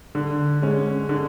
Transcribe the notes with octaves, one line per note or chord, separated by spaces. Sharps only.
D3
G#3 C#4
D3